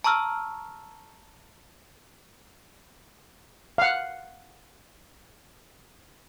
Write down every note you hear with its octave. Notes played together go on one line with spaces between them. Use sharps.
A5 A#5 C#6 E6 F6
F5 F#5